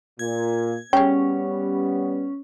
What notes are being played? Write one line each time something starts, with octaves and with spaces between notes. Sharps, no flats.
A#2 G#6
G3 B3 C#4 G#4 G5